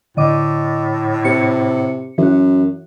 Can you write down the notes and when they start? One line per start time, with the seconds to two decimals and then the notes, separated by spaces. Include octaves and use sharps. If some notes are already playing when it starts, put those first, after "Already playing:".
0.17 A2 D3 D#5 D6
1.25 C3 C#7
2.18 F#2 E3 F#4